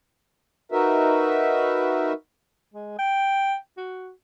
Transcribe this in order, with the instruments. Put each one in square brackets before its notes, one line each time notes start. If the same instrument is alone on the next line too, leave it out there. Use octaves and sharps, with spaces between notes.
[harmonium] D#4 F#4 A#4 B4 E5
[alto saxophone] G#3
G5
F#4